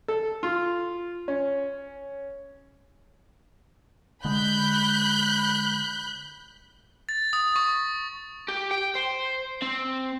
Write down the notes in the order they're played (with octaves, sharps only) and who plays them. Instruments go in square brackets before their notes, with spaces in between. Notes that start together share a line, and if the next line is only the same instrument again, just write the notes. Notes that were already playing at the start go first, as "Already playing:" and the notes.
[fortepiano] A4
F4
C#4
[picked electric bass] D3 G#3 [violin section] B5 F#6 G6
[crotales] A6
D#6
C#6
[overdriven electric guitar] G4
G5
C5
C4